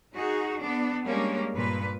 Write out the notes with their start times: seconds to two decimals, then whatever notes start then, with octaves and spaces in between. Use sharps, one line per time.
0.14 D#4 F#4 G#4
0.59 B3 D4
1.04 G3 G#3 A#3 C#4 D4
1.52 G2 A#2 B4